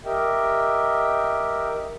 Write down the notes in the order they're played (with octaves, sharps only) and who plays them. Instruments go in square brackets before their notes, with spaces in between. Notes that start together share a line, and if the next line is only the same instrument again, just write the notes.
[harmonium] G4 A#4 D#5 E5 G5